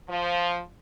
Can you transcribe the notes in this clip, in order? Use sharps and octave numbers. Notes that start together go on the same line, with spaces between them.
F3